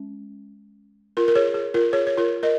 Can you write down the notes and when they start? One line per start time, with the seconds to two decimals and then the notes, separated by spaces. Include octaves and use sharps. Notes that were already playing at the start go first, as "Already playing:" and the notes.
Already playing: G#3 C#4
1.17 F4 A#4
1.28 A#4
1.35 G#4 C#5
1.54 G#4
1.74 F4 A#4
1.93 G#4 C#5
2.07 C#5
2.17 F4 A#4
2.43 A#4 D#5